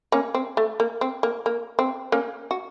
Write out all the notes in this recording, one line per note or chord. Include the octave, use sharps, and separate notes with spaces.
A#3 C#4
C4
A3
A#3
C4
A#3
A#3
C4
A#3 C#4
F#4